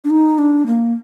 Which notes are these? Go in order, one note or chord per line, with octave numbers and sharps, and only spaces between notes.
D4
D#4
D4
A#3